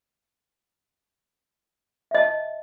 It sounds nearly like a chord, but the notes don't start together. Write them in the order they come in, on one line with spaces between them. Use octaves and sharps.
E5 D#5 A5